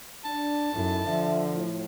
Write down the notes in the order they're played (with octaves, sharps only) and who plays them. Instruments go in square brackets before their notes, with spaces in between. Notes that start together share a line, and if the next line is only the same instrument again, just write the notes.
[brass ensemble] D4 [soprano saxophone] A5
[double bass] F#2 [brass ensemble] D#4 E4 A4
[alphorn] D3 [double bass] F3 [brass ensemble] E5
[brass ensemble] A2